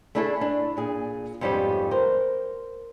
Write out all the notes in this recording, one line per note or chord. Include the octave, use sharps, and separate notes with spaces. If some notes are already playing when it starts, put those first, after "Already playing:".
A3 D4 E4 G#4 A4
D4
A#2 G#4
F2 G#2 G3 B3 C#4 G4
A#4 C5